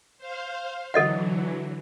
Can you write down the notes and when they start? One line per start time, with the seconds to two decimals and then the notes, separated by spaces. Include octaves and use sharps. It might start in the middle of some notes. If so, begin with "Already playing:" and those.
0.18 C5 F5
0.94 D3 E3 F#3 A4 D#5 F#5